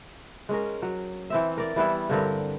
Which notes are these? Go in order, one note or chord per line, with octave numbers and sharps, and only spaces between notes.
G#3 C#4 A#4
F#3
E3 C4 E5
A#4 D5
E3 G3 B3 E4
G2 D3 C4 A#4